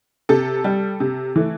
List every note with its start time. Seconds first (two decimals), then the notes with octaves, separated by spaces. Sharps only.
0.29 C3 A4
0.64 G3
1.00 C3
1.36 E3 A3